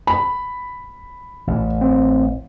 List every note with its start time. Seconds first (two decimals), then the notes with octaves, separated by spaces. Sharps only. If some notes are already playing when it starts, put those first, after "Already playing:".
0.07 B5
1.47 A1
1.81 C4